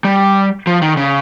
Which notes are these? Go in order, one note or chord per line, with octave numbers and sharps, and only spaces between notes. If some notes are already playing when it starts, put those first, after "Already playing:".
G3
F3
D#3
C#3